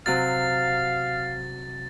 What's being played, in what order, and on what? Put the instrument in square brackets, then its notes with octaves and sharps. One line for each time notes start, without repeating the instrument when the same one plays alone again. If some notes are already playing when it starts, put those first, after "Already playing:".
[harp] C3 F#3 F6 [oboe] F5 [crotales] A6